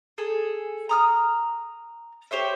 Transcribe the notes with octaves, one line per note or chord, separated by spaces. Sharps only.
G#4 A4
A#5 D#6 F6
G4 C5 C#5 E5